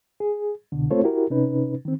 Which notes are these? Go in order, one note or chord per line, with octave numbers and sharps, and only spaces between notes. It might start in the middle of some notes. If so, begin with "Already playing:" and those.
G#4
C2 B2 D3
A3 C4 F4 A4 C5 C#5
E4 F#4 G4 A#4
C3 C#4 D#4 B4
D#3 C4